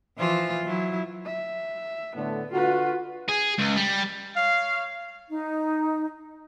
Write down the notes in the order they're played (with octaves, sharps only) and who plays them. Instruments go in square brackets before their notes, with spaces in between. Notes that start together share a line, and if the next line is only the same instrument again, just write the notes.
[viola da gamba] E3 F3 F4
F#3 E4
[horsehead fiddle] E5
[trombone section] A2 D3 A3 [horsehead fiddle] B3
[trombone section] D3 F#4 [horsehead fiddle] F4 B4
[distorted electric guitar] G#4
C#2
G3
[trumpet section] C#5 F5
[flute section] D#4